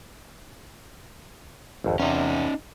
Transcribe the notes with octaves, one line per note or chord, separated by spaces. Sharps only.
G#1 F2
E2 C3 C#4 D#4